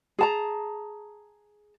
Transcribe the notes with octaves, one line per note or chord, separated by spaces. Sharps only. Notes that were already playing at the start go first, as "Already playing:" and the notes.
G#4 A5 A#5